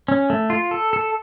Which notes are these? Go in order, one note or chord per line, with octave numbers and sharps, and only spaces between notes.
C#4
A3
F4
A4
A4